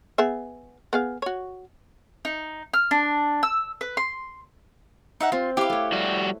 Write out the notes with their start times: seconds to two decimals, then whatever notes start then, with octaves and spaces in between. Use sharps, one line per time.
0.18 B3 G#4 E5
0.93 B3 G#4 F5
1.22 F#4 C#5
2.25 D#4
2.73 F6
2.91 D4
3.43 E6
3.81 B4
3.97 C6
5.20 D#4 E5 F#5
5.32 C4 F4
5.57 E4 G4 B4 F5 D6
5.70 A3 C#5
5.92 G3 F#4